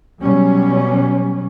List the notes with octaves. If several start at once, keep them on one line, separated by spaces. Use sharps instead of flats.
B2 F#3 G3 C#4